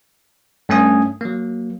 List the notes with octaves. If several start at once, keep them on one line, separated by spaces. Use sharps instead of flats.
G2 A3 C#4 G#5 D#6
F#3 A#3